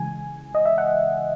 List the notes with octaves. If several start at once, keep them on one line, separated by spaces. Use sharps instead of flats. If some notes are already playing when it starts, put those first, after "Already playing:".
Already playing: C#3 E3 G#3 G#5
D#5
E5
F#5